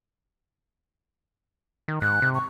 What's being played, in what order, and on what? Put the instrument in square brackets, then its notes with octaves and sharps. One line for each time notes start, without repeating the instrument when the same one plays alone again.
[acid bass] D#3
[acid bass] G#2 [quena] F#6
[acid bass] C3
[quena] C#6